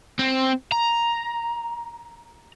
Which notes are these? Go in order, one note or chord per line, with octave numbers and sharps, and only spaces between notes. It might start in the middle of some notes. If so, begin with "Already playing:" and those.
C4
A#5